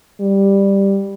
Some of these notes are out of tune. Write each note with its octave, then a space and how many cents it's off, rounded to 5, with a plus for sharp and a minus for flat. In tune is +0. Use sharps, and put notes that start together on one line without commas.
G3 +5